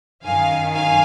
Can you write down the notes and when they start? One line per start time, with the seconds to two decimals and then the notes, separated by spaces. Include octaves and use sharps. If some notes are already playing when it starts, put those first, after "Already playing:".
0.24 F#2 D#3 F5 G#5
0.73 F5 G#5